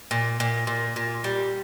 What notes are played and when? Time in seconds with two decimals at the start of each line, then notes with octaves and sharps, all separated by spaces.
0.11 A#2
0.40 A#2
0.67 A#2
0.96 A#2
1.24 G3